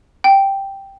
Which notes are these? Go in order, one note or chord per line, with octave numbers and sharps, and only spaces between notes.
G5